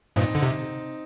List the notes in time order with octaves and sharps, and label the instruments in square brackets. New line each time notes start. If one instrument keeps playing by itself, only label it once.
[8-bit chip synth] G2 A#2 [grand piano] C4 D#4
[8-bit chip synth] D3
C3